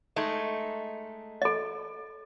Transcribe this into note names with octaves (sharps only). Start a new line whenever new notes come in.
G#3 A3 D#4
A4 D#5